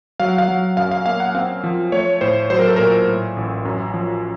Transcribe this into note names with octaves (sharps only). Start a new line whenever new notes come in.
F#3 F5
F#5
F5
F#3
F#2 F5
F5
A#3 F5
F#5
C4 F5
F3
A3 C#5
A2 C5
F#3 C5
A#4
A4
A#2 A#4
A2
A1
F#2
F3